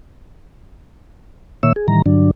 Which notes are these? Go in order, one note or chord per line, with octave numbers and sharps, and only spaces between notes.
A#2 D#3 A#3 C#5 E5 E6
G#4
A2 D#3 E3 G3 A#5
G2 D3 F#3 D4